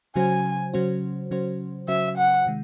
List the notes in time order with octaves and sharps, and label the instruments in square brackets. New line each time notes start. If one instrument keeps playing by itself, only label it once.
[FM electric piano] C#3 F#3 C#4 F#4 C5 [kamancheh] G#5
[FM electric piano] C#3 F#3 C#4 F#4 C5
C#3 F#3 C#4 F#4 C5
[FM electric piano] C#3 F#3 C#4 F#4 C5 [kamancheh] E5
[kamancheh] F#5
[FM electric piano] C3 D#3 G#3